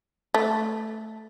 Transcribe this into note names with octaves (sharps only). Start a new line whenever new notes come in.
A3